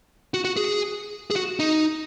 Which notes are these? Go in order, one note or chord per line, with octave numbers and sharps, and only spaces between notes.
F#4
F#4
G#4
G#4
F#4
D#4